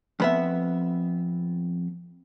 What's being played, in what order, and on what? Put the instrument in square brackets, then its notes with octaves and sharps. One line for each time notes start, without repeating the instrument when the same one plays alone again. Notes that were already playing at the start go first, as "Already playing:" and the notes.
[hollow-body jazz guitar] F2 B3 E5